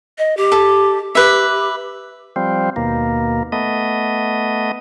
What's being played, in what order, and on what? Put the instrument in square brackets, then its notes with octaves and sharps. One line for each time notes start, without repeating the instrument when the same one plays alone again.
[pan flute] D#5
G4
[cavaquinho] A4
[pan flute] G4 [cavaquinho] B4 E5
[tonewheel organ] F3 G3 C4
D#2 B2 A#3
A3 B3 D#5